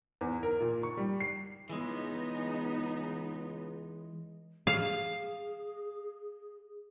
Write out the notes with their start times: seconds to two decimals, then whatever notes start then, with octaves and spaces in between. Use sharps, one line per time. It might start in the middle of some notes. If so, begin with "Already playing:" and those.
0.21 E2
0.43 A#4
0.60 A#2
0.83 C#6
0.97 G3
1.20 C7
1.69 C#2 E3 G#3 B3 D#4
4.67 G#4 F5